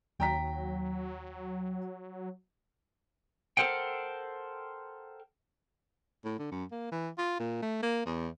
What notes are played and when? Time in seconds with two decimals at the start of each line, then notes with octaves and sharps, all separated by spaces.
0.20 D#2 F#3 G5 A#5 B6
3.57 A4 A#4 C5 F#5 G5
6.25 A2
6.39 D3
6.51 F#2
6.71 A#3
6.92 E3
7.18 F4
7.39 A#2
7.62 A3
7.83 A#3
8.06 E2